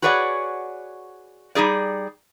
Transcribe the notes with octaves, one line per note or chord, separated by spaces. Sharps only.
F#4 G#4 B4 C#5 D5 F#5
G3 D#4 G#4 D5